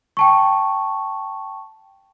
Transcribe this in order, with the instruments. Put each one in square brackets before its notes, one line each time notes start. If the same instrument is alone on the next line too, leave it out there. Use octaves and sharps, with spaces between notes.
[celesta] G5 A5 C#6